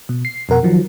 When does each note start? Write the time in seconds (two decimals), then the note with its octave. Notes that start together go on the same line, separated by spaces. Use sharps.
0.09 B2
0.25 C7
0.49 F2 B2 A#4 F#5
0.63 D#3 F3 F#3